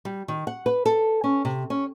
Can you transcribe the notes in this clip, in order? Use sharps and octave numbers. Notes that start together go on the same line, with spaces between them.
G3
D#3
F#5
B4
A4
C#4
C3
C#4